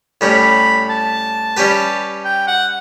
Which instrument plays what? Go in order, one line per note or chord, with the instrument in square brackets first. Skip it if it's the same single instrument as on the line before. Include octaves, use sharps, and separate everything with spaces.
[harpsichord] A2 G3 C#4 [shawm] B5
[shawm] A5
[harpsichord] G3 C#4 G4 B4
[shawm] G5
F#5